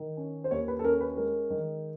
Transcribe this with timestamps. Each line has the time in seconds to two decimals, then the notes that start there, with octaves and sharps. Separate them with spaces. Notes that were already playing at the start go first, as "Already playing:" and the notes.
Already playing: D#3
0.17 C#4
0.44 C5
0.51 D#2 C#5
0.68 B4
0.79 A4
0.84 C#4 A#4
1.01 B4
1.17 G#3 A#4
1.50 D#3